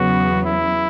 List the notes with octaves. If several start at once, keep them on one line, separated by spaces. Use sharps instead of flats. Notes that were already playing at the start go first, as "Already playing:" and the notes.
Already playing: E2 C#3 F#3 B3 F#4
E4